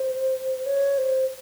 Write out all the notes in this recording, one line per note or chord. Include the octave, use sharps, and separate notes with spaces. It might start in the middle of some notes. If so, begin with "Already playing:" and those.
Already playing: C5
C#5
C5